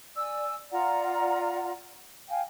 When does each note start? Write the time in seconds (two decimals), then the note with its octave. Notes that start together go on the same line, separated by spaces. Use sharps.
0.16 D5 G#5 E6
0.71 F4 D5 F#5 A#5
2.29 F5 G5 G#5